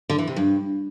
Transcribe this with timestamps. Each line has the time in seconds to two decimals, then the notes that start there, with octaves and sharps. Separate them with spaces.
0.09 D3
0.18 E3
0.27 C3
0.36 G2